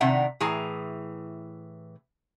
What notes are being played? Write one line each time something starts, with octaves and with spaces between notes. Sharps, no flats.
C3 D#3 D4 E5 F#5 A#5
A2 E3 G#4 A#5